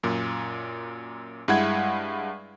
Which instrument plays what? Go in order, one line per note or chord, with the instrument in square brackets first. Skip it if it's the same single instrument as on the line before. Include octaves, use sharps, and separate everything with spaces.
[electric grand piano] F#2 A#2
G2 G#3 E4 F#5 G#6